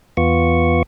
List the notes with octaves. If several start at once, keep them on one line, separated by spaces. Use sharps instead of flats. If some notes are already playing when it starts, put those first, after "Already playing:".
E2 B3 F4 C#6